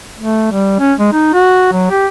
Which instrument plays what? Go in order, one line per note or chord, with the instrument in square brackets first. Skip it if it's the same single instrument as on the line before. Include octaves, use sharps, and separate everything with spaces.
[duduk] A3
G3
C#4
G#3
D#4
F#4
F#3
G4